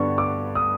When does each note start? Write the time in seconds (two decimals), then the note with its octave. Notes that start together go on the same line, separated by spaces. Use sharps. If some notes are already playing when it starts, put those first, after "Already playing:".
Already playing: G2 D3 G3 B3 D4 C#6
0.18 D6
0.55 D#6